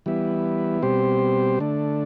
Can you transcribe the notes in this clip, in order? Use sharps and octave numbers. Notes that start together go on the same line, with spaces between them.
E3 G3 B3 E4
B2 G3 C4 G4 C5
D3 A3 D4